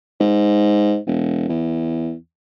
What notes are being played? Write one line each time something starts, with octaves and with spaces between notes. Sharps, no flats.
G#2
E1
E2